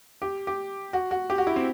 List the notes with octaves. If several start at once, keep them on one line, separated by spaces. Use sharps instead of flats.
G4
G4
F#4
F#4
G4
F#4
E4
C4